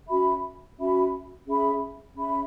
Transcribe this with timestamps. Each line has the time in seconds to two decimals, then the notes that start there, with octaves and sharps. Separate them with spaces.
0.09 C#4 F#4 E5 B5
0.78 C#4 F#4 E5 B5
1.47 C#4 G#4 E5 B5
2.17 C#4 G#4 E5 B5